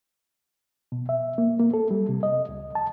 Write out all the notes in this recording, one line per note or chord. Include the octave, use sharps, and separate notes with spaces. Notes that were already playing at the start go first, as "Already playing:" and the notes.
B2
E5
A#3
A#3
A4
G3
C3
D#5
C#2
A5